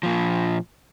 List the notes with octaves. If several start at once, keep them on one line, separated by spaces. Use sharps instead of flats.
A#2 F3